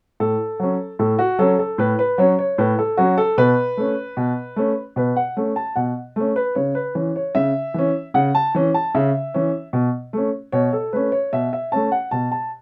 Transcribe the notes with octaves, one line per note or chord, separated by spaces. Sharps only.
A2 A4
F#3 C#4
A2 A4
F#4
F#3 C#4 A4
A4
A2 B4
B4
F#3 C#4 C#5
C#5
A2 B4
A4
F#3 C#4 F#4
A4
B2 B4
A3 C#4
B2
A3 C#4
B2 B4
F#5
A3 C#4
A5
B2 F#5
A3 C#4
B4
C#3 C#5
B4
E3 C#4
C#5
C#3 E5
E3 C#4
C#3 F#5
A5
E3 C#4
A5
C#3 E5
E3 C#4
B2
A3 C#4
B2 C#5
A4
A3 C#4 B4
C#5
B2 E5
E5
A3 C#4 A5
F#5
B2 A5
A5